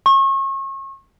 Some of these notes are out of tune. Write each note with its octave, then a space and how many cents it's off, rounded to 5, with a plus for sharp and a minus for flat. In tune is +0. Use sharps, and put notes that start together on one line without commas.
C#6 -35